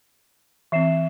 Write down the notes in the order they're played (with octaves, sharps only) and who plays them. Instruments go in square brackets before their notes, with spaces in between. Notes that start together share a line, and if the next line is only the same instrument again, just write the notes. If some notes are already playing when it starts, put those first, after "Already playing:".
[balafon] E3 C4 [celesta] E5 C7 E7